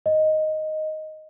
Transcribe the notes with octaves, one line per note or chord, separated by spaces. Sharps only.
D#5